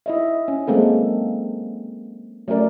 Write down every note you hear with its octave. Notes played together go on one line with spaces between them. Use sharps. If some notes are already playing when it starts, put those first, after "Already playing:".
E4 D#5 E5
C#4
F#3 G#3 A#3 C4 A4
F#3 A3 C#4 A#4 D5